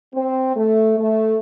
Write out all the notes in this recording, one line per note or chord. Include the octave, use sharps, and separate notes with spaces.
C4
A3
A3